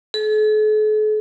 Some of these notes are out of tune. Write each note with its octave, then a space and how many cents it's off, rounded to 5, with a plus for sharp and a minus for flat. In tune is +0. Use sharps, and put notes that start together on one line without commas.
A4 -45